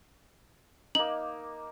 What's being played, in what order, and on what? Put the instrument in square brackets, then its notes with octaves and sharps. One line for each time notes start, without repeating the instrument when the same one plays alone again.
[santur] A#3 D#4 [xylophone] F#7